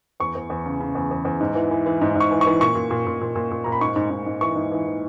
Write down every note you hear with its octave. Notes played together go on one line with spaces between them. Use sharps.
E2 C#6
E2
E2
C#3
C#3
E2
E2
E2
G#2
E3
E3
E3
G#2
G#2
C#6
E3
C#6
E3
A#2 C#6
A#2
A#2
A#2
A#2
A#2
A#2
A#2 A#5
B5
G#2 C#6
G#2
G#2
G#2
E3 C#6
G#2
E3
E3